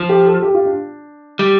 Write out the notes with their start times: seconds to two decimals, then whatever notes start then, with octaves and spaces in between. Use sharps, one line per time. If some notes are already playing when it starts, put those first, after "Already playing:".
Already playing: F3
0.09 G4
0.25 A4
0.42 G4
0.54 F4
0.66 D4
1.39 G3